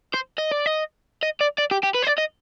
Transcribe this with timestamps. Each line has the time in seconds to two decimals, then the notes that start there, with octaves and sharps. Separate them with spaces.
0.14 C5
0.38 D#5
0.52 D5
0.66 D#5
1.23 D#5
1.41 D5
1.58 D5
1.71 G4
1.83 G4
1.95 B4
2.03 C5
2.07 D5
2.18 D#5